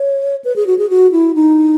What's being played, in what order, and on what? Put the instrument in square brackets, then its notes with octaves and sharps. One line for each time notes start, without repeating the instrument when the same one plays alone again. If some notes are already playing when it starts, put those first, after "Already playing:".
Already playing: [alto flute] C#5
B4
G#4
F#4
G#4
F#4
E4
D#4